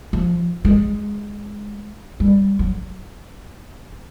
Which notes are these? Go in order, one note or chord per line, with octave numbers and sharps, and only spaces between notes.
F3
G#3
G3
F#3